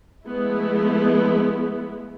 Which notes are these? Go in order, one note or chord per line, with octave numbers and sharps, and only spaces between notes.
F3 G#3 A3 B3 E4